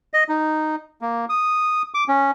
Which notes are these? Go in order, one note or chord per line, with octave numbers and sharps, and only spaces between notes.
D#5
D#4
A#3
D#6
D6
C#4